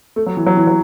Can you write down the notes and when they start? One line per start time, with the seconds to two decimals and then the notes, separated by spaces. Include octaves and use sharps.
0.16 A3
0.26 F#3
0.37 E3
0.47 F#3
0.57 E3
0.67 F#3